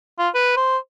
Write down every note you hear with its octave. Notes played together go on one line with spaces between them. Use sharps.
F4
B4
C5